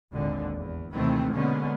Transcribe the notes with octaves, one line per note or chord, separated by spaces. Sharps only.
G#1 D#2 A#2 D3
E2
D#2 C3 D#3 E3 A3 C4
B2 D3 G#3 A#3 B3 C#4